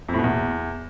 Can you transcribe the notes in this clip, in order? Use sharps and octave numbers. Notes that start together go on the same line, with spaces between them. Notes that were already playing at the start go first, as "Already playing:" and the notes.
F2
A2
B2
E2